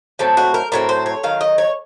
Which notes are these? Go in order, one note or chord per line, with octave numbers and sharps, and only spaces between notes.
A2 F#3 C4 A4
F#4
A#4
A2 F#3 C4 A#4
C5
C#5
D#3 F#3 F5
D#5
C#5